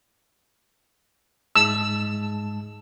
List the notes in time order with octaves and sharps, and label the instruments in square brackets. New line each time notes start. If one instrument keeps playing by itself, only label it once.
[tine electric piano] G#2 G#3 A5 [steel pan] E6